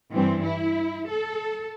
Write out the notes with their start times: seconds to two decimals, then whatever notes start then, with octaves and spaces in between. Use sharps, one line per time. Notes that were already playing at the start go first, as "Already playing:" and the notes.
0.12 G2 E3 C4
0.43 E4
1.09 A4